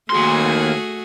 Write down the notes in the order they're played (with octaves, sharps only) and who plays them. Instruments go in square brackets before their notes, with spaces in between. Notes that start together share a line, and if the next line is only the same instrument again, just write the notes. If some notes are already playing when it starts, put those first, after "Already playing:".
[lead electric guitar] D#2 C6 [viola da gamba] A3 F#4 G#4